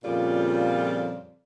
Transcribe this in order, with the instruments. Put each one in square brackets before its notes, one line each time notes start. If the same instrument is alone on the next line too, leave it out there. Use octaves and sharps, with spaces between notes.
[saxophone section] F2 A#2 C#3 G3 F4 D5